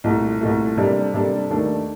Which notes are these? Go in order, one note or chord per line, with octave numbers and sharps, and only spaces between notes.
C2 A#2 A3
C2 A#2 A3
C3 G3 A#3 D4 A4
C3 G3 A#3 D4 A4
D#2 D#3 A3 D4 A4